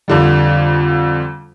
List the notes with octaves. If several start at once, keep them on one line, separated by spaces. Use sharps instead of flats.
F2 D3 G3